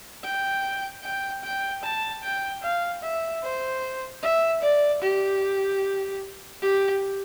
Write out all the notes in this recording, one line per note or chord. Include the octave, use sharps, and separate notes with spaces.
G5
G5
G5
A5
G5
F5
E5
C5
E5
D5
G4
G4